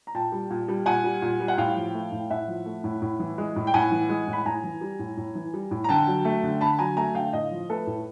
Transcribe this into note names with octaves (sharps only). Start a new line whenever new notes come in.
A#5
A#2 G5 A5
G3
A#2
G3
A#2 F#5 G#5
G3
A#2
G3
F#5
A2 F5 G5
F3
A3
A2
A2 E5 F#5
F3
A3
A2
A2
E3
G#3
A2
G5
A2 F#5 G#5
E3
G#3
A2
B5
A2 G#5 A#5
E3
G3
A2
A2
E3
G3
A2
A#5
D3 G5 A5
F#3
A3
D3
D3 A5 B5
F#3 G#5 A#5
A3 G#5 A#5
D3 F5 G5
A2 D#5 F5
F3
A3 A4 B4
A2